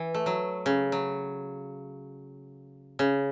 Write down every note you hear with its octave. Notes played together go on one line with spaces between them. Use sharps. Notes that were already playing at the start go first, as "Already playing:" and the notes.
Already playing: E3
A3
F#3
C#3
F#3
C#3